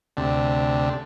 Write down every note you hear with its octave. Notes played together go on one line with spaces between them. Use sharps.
D2 C3 D4